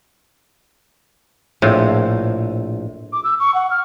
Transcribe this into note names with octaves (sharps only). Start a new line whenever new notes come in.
A#1 A2 C4 A5
D6
E6
C#6
F#5
F6